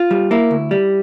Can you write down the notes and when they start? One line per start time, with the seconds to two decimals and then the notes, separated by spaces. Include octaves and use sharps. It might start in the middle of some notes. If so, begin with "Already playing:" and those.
Already playing: F4
0.11 G3
0.31 A#3 E4
0.51 D2
0.71 G3